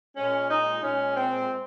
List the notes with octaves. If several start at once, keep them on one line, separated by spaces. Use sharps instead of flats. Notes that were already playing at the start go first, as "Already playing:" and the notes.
A#2 G#3 C#4
D#4
A#2 G#3 C#4
C4